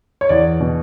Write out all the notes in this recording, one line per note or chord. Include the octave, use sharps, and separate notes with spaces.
C#5
E2 D5
B2